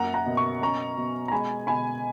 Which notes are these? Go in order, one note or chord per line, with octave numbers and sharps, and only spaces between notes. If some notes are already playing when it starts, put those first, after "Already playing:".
Already playing: F#2 A#3 F#5 A#5
F#5 A#5
B2
C#6
C#4 A#5 C#6
B2
A#5
G#3 G#5 B5
B2 G#5 B5